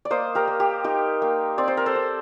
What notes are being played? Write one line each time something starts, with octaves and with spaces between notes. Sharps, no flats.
D5
A#3 C5 D#5
G4 A#4
A#3
G4
D#4 G4 A#4
A#3
C4 D5
C5
A#4
A4 C5
C4